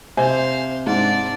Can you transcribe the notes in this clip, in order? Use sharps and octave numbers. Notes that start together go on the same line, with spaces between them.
C3 C5 F5 G#5
G#2 D4 D5